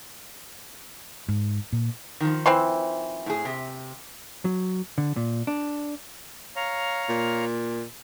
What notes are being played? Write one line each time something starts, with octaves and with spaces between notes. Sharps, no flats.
G#2
A#2
D#3 F3
E3 C4 C6
A2 G#4
C3
F#3
D3
A#2
D4
C#5 F5 A#5
A#2